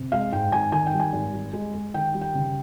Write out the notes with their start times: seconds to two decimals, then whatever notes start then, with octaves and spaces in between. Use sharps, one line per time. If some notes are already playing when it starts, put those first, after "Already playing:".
Already playing: C3
0.12 G#3 F5
0.33 G#2 G5
0.52 G#1 G#5
0.72 D#3 G#5
0.87 G5
0.93 G3
1.00 G#5
1.13 G#1
1.33 G3
1.53 G#3
1.74 G#3
1.94 D#3 G5
2.14 G3
2.21 G5
2.35 C#3